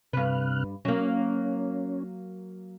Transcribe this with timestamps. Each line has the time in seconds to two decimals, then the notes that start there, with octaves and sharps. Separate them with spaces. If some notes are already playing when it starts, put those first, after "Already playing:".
0.13 G2 C3 B4 F6 F#6
0.85 F#3 A#3 C#4